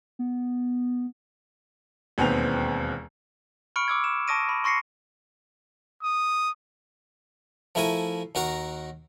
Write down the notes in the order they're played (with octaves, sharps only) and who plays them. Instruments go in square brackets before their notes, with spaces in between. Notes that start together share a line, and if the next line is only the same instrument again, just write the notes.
[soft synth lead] B3
[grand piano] E1 D#2 B3 C4 G5 F7
[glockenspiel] B5 C#6 F6 C#7 D7
D6 E6 G#6
E7
A5 C#6 D#6 A#6 D7 D#7
B5
C6 C#6 A#6 C7 C#7
[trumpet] D#6
[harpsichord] F3 A3 E4 A#4 G#5
D#2 F#4 A#4 A#5